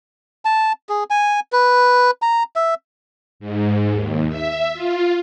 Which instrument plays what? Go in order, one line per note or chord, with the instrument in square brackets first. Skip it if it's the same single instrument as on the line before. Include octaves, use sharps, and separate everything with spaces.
[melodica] A5
G#4
G#5
B4
A#5
E5
[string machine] G#2
D#2
E5
F4